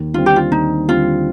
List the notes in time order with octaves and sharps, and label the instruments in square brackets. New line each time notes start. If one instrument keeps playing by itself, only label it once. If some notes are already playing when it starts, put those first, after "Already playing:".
Already playing: [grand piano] D#2
[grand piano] D3 G3 C4 [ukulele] F4
[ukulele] G4
F4
[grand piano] D#2 [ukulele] D#4
[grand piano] D3 G3 C4 [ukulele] F4